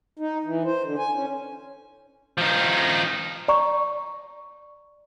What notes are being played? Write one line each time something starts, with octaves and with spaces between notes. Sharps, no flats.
D#4
E3
C5
D3
G#5
C#4
F3 D#4
D5 A#5 C#6